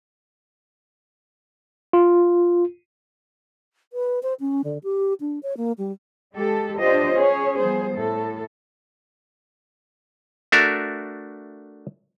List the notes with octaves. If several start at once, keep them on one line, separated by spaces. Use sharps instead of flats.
F4
B4
C5
C#4
D3
G4
D4
C#5
A#3
G3
G#3 G4 A4
D4 F4 G4 C5 D#5
C#4 G#4 C#5
F3 G3 B3 G#4 C5
A2 A4
A3 D4 F#4 A#4 E5